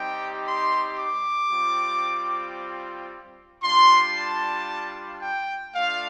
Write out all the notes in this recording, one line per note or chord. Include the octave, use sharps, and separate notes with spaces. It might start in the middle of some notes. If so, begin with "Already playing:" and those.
Already playing: G3 C4 D#4 G4 G5
C6
D6
G3 C4 F4
G3 D4 F4 C6
A5
G5
A3 D4 F4 F5